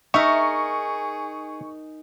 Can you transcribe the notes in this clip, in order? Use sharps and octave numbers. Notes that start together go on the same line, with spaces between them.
D#4 G#4 A#4 E5 C#6